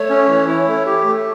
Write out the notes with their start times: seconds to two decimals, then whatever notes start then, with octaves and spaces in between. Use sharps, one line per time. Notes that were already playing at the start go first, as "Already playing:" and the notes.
Already playing: A3 C#5
0.09 C#4
0.28 E3
0.47 E4
0.68 A3
0.86 G4
1.06 A3